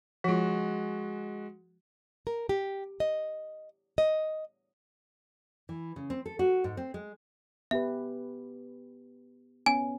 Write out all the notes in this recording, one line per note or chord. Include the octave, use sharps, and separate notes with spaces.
F3 G#3 F4 F#4
A#4
G4
D#5
D#5
E3
C#3
C4
A4
F#4
G#2
C4
G#3
B3 G4 B4 E5
B3 C#4 G#5